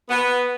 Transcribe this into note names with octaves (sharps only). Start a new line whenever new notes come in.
B3